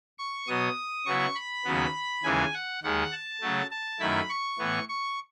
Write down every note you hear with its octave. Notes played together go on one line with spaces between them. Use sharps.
C#6
B2 F#3 B3 D#6
C#3 F#3 B3 E4 C#6
B5
D#2 C#3 F#3 B3
D#2 C#3 E3 G#3 G#5
F#5
D#2 D#3 G#3 F#5
A5
C#3 F#3 A3
A5
F#2 D#3 A3 E4 B5
C#6
A2 E3 B3
C#6